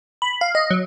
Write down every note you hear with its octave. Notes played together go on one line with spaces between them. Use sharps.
B5
F5
D#5
F#3